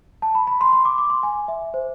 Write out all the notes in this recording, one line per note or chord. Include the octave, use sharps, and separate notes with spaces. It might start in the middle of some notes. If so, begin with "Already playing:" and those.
A5
B5
B5
C6
C6
D6
D6
C6
G#5
E5
C5